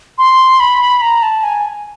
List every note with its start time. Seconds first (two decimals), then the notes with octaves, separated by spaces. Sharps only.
0.18 C6
0.60 B5
1.02 A#5
1.22 A5
1.43 G#5